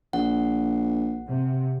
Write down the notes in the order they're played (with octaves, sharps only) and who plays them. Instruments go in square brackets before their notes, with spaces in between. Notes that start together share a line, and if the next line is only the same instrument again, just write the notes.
[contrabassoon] A#1 [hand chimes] F#5
[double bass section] C3